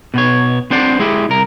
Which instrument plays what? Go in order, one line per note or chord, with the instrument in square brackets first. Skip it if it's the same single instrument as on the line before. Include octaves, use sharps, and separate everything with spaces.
[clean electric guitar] B2 B3 C#5
C4 D4 C5 D5 F#5
G#3 E4 G4
C2 A#4